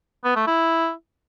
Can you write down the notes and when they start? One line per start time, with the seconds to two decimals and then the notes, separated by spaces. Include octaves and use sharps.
0.24 B3
0.36 A3
0.47 E4